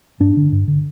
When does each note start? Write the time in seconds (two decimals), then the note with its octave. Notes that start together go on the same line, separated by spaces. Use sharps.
0.20 G2 D4
0.37 D3
0.52 G2
0.68 D3